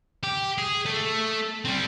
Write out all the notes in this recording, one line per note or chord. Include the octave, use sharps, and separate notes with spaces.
G4
G#4
A3 A4
G3 C4